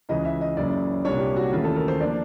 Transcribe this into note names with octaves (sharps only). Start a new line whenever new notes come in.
C#2 C#3 E3 D#5
E5
D#5
F#1 F#2 C#3 D5
C2 A#2 G3 A#3 D4 C#5
G4
F#4
D#2 C#3 E3 A3 F4
A4
A#4
C5
F3 A#3 D4 D5